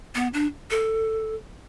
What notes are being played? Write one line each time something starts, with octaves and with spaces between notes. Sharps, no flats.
B3
D4
A4